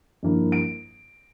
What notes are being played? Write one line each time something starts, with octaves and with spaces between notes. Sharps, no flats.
G2 F3 A#3 E4
D7